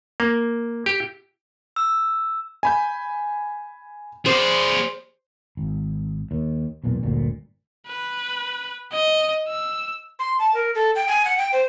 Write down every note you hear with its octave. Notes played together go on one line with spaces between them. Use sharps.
A#3
G4
E6
G#5 B5 G6
G#4 C5 D5
G#1
D#2
B1 E2 A#2
G1 D2 A#2
B4
D#5
E6
C6
A5
A#4
A4
G5
G#5
F#5
G5
C5